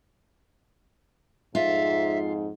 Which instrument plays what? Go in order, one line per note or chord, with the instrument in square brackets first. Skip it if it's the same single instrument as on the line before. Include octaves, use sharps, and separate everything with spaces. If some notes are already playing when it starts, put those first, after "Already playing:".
[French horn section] F2 G#2 [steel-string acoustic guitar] F4 [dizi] E5